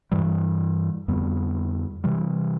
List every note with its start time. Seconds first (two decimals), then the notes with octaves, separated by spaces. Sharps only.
0.11 G2 E3 G3
1.08 F2 D3 G3 B3
2.04 C3 E3 G3